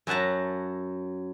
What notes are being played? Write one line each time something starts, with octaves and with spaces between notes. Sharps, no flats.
F#2 E5 F#5 A5 A#5